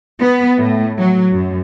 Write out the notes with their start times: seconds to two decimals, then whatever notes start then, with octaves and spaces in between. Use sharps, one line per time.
0.21 B3
0.59 A2
0.98 F#3
1.32 F#2